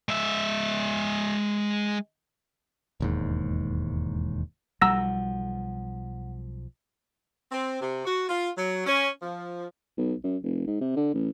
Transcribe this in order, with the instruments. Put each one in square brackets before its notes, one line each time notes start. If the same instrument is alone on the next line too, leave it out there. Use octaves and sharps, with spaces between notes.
[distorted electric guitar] G#3 E5
[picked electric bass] E1 D#2 G#2
[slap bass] B1 F3 [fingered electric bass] G3 [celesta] F#5 [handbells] A#5 E6 A#6
[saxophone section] C4
C3
F#4
F4
F#3
C#4
F3
[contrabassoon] B1
F#2
F1
G#2
C3
D3
A1